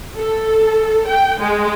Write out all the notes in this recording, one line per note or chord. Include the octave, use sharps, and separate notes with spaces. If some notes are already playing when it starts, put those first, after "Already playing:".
A4
G5
G#3